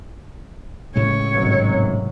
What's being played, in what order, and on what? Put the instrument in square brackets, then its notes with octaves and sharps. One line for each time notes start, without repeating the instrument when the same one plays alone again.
[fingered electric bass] A2 C#3 G#3 [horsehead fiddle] C#5
[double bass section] G#1 C3 F#3